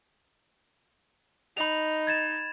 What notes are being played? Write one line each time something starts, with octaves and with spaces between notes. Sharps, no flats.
D#4 B5 F7
G#6 A6 E7